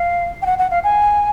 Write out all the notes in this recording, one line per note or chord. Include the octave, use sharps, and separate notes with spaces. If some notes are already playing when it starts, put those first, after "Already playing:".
Already playing: F5
G5
F#5
F#5
F5
G#5